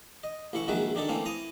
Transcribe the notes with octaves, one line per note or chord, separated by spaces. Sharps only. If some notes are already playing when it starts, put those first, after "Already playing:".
D#5
A1 E3 E4 C#6
A#1 D#3 F#3 G#3 B4 E5
D#3 D4 D#4 A4
E3 A3 A#3 C4 C#4
E3 A#5 D#6